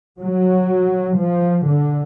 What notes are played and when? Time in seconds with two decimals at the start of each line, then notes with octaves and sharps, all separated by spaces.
0.19 F#3
1.18 F3
1.66 D3